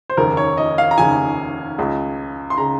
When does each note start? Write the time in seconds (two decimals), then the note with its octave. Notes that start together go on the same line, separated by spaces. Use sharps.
0.10 C5
0.17 F1 D#2 C#3 A#4
0.37 C#5
0.57 D#5
0.78 F5
0.91 A#5
0.98 F1 D#2 C#3 G#5
1.78 C#2 C#3
2.50 C6
2.58 C#3 A#5